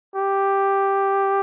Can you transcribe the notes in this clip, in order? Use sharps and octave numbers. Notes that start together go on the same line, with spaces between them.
G4